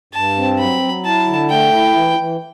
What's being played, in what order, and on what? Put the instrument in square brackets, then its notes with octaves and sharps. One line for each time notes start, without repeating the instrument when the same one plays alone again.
[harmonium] G2 [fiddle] A5
[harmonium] C4
[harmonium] F#3 [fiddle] B5
[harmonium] F#3
[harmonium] E4 [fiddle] A5
[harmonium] D3
[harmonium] A3 [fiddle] G5
[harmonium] E4
E3
E3